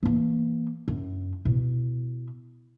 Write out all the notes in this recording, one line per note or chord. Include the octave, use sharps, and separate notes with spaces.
E3 A#3
F#2
B2 E4